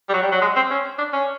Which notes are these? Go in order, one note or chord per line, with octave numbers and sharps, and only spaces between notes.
G3
F#3
G3
F#3
G#3
C4
C#4
D4
C#4